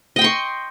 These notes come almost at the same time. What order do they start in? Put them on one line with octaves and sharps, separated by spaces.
D#5 G5 C6 C#6